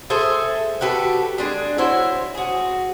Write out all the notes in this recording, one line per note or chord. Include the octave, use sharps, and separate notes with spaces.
G#4 A4 C5 E5
F#4 G4 A4 B4
G#3 D4 G#4
E4 F#4 C5 C#5
F#4 G#4